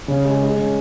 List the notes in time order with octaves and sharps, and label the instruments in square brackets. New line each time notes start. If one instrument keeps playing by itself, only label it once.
[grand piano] C#3
G#3
G#3
C#4